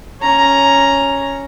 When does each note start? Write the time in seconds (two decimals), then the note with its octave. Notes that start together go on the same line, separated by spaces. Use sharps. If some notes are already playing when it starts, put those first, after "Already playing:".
0.21 C#4 A#5